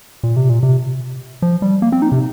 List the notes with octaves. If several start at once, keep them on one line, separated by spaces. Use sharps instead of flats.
A#2
C3
A#2
C3
F3
G3
A#3
C4
D#4
C3